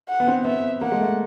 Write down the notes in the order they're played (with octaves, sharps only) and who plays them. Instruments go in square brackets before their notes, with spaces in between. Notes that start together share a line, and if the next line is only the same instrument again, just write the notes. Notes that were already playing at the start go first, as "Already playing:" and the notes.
[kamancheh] F#5
[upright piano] B3
C4
[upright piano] B3 [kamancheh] E5
[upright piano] A#3 [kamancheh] F#5
[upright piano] G#3
A3